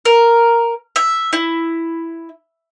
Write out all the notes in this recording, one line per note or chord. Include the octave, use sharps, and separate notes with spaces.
A#4
E5
E4